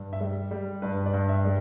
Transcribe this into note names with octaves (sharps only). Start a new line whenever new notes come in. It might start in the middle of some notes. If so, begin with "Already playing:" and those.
Already playing: G2
E5
G3
G3
G2 B4
D5
G2
E5
G3